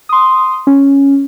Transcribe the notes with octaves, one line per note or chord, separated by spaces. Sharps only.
C6 D#6
C#4